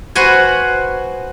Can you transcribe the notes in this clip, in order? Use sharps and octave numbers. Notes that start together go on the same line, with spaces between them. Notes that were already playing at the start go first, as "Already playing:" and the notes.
F#4 B4 C5 F#5 G#5